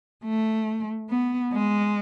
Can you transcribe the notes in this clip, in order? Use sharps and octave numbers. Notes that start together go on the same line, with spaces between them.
A3
B3
G#3